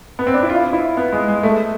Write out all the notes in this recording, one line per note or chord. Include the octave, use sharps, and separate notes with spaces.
B3
C4
D4
E4
F4
E4
B3
G#3
G#3
A3